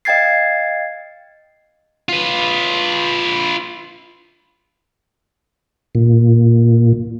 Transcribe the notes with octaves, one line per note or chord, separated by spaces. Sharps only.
D#5 F5 G5 G#6 A6 C7
F4 B4
A#2